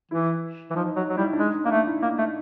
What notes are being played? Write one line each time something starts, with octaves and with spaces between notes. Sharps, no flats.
E3 E4
E3
F3 D#4
F#3
F#3
G3 E4
D4
G#3 D#4
D#4
A#3 D4
A3 D#4
E4
A#3 D#4
A3